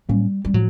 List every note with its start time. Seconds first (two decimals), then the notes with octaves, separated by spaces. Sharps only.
0.09 A2 F#3 G3 A#3 C#4
0.45 G3
0.54 A2 F3 F#3